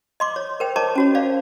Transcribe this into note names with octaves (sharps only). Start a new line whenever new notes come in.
D#5 C6 D6
C#5
A#4 C5 G5
A#4 C#5 D#5 A5 D6
C#4 F#4 C#5
C5 D5 F5